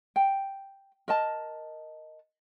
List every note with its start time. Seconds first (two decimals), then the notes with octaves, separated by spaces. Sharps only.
0.16 G5
1.08 A#4 D#5 A5